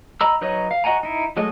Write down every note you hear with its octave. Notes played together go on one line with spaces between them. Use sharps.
D#5 A#5 B5 E6
F#3 D#4 B4 C#5 D#5
F5
F#4 D#5 F#5 G#5 A#5
D#4 E4
F#3 G#3 A3 D#5